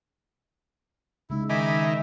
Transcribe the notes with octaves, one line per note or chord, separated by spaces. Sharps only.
C#3 G#3 D#4 E4
D#3 E5 G#5 B5 D6